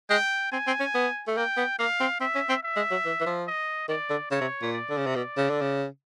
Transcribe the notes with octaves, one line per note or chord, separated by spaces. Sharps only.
G#3 G5
C4 G#5
C4
C#4
B3
A3
A#3 G5
B3
A#3 F5
C4
C4 E5
C#4
C4
E5
G#3
F#3
E3
E3
F3
D#5
D#3 D5
D3
C#3 C#5
C3
A#2
D5
D3
C#3
C3
B2 D5
C#3
D3
C#3